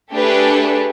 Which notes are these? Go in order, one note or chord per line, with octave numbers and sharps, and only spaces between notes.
A3 D4 G4 G#4 B4